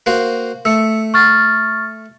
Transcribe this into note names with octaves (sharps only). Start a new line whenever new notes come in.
A#3 F#4 C5
A3 E6 C#7
C#6 F6 A6